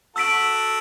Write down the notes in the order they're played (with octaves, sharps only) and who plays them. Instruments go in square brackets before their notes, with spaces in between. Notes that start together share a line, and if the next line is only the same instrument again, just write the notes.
[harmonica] F#4 A4 [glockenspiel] E6 B6 D7 F#7